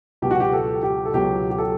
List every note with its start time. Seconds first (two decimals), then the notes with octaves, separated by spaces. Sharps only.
0.22 C#2 B2 F#3 G4
0.31 F#4
0.40 G4
0.53 A4
0.83 G4
1.05 A4
1.14 C#2 B2 F#3 G4
1.50 G4
1.58 A4